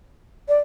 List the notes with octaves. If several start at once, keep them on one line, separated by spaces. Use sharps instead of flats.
D5